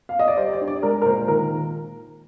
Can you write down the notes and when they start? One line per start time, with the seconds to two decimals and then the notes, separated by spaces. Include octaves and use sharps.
0.09 F5
0.19 D#5
0.28 D5
0.37 G3 C5
0.53 D5
0.61 D4
0.68 D5
0.83 G#3 A#4
1.02 A#4
1.06 A#2 C5
1.28 D#3 A#4